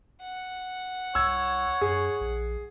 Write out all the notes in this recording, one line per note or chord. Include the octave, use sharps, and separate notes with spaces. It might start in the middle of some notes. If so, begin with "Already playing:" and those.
F#5
C2 C#5 E6 G#6
F#2 G#4
A#1